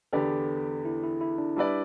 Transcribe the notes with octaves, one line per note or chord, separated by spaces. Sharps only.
E2 D3 B3 G4 A4 D5
E4
E4
E4
D4
G3 D4 E4 B4 D5